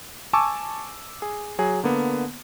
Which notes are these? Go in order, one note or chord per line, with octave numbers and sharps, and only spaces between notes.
G#5 A5 C#6 D6 E6
G#4
F#3 G#4
D3 A#3 B3